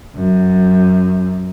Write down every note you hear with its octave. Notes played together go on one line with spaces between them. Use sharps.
F#2